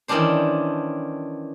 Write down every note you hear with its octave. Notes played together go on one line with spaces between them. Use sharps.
D#3 E3 G3 C#4 D4 C5